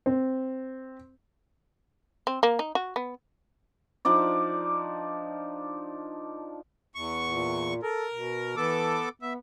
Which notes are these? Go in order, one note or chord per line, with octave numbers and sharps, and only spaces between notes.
C4
C4
A#3
D#4
F#4
B3
F3 D4 D#4 D5
E2 C#6
A#2
A4 A#4
B2
E3 B3 A4 D6
B3 E5